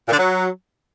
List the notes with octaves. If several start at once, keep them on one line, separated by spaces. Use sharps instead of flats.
A#2
D3
F#3